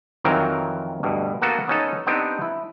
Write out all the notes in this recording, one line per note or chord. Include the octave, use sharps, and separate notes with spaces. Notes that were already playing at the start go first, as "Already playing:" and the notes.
F2 D#3 E3 F#3 C4 A#4
D2 G2 B2
A#3 B3 F#4 A4
B3 C#4 D#4 A4
B3 C4 D4 D#4 G4
E4